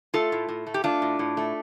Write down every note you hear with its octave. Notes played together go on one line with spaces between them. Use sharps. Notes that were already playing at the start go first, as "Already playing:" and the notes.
A3 F4 A4
A2
A2
A3
G4
A3 D4 F4
A2
A2
A3